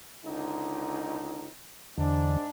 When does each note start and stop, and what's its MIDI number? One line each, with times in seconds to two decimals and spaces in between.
0.24 1.45 37
0.24 1.45 50
0.24 1.45 63
1.98 2.37 40
1.98 2.48 44
1.98 2.37 50
1.98 2.48 62